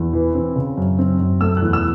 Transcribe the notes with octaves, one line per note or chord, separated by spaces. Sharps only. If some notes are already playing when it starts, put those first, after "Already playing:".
Already playing: E2
E3
C4
C#3
F#2
C4
F#2
A3 E6
F#6
E2
E6